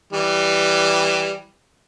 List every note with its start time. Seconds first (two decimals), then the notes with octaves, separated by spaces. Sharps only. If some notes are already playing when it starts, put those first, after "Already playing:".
0.13 E3 G3